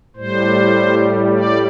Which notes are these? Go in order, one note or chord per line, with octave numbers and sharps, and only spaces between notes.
A2 G3 C5
D5